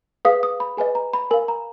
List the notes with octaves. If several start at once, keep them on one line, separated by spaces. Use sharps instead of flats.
G#4 B4 F5 D#6
D#6
B5
G#4 B4 D#5 G#5
A#5
B5
A#4 F5 G#5
A#5